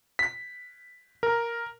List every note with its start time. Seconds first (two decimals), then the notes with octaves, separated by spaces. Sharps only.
0.19 B6
1.23 A#4